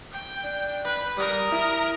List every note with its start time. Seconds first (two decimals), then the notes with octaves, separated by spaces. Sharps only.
0.12 G5
0.44 D4
0.85 B4
1.17 G3 A#4 D#6
1.52 E4